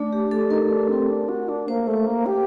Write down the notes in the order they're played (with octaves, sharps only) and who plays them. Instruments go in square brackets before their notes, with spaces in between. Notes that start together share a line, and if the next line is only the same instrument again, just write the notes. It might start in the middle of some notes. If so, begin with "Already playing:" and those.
Already playing: [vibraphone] A3 [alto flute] D4
[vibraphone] G4
A4
[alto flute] D#4 [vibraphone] A#4
[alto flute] D4
C4
D4
F#4
D4
[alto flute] A#3 [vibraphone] C5
[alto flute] A3
A#3
G4